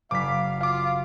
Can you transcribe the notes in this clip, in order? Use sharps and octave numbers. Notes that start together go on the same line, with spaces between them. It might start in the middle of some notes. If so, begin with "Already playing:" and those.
F#1 F5 D6 B6
F4 F5 D6